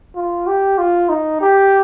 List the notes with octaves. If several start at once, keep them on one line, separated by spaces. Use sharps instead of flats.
F4
G4
F4
D#4
G4